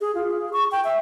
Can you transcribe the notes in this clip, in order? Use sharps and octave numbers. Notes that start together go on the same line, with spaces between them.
G#4
F4
G#4
C#6
G5
E5